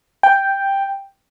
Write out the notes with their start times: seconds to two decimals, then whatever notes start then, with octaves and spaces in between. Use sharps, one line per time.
0.23 G5